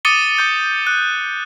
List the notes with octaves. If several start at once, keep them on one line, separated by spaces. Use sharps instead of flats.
D6 D#6 A6 C#7 D#7 G7
D6 G6
F#6